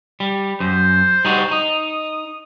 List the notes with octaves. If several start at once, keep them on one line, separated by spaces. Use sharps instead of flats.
G3
F#2 C5
G3 D#4 F#4
D#4 D#6